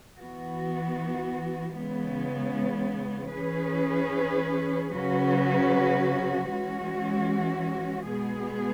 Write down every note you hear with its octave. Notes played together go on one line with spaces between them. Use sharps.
E3 B3 F#4
C#3 E3 G#3 B3
E3 C#4 G#4 B4
C#3 F#3 C#4 F#4 B4
E3 G#3 C#4 F#4
B2 G#3 B3 G#4